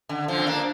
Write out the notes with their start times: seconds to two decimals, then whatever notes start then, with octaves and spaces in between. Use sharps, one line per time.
0.09 D3
0.28 D3 F3
0.38 C4
0.46 A#3 D4